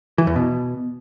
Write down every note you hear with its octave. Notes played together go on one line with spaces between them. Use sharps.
E3
E2
B2